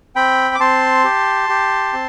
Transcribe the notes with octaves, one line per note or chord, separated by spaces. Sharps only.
C4 G5 B5
D6
C4 A5 C6
G4
G4
C4